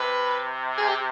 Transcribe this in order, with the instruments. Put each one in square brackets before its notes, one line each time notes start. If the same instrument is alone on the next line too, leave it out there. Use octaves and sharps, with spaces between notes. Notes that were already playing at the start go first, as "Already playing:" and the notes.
Already playing: [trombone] C3 [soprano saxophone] B4
[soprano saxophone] G#4
G4